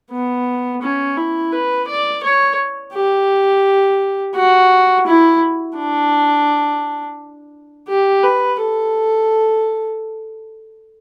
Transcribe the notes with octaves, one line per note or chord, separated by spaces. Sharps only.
B3
C#4
E4
B4
D5
C#5
G4
F#4
E4
D4
G4
B4
A4